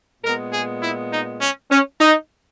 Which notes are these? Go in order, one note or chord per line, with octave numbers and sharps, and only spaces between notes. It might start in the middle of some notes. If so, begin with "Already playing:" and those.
A#2 G#3 B3 A#4
G#4
E4
D#4
C#4
C#4
D#4